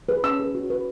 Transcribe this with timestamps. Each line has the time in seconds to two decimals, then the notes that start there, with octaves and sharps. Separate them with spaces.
0.09 G#4 B4
0.24 C#4 E6
0.40 G#4 B4
0.55 F#4
0.70 B4